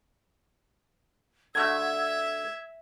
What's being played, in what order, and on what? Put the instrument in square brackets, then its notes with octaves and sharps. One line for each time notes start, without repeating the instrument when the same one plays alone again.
[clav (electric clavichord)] D3 A3 F#4 [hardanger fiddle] E5 [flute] E6 [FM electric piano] G#6